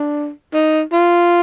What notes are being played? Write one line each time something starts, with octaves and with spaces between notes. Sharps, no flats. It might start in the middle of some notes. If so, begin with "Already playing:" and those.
Already playing: D4
D#4
F4